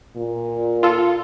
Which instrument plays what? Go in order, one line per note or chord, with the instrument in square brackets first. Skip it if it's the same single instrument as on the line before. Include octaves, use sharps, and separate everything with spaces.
[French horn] A#2
[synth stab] F4 A4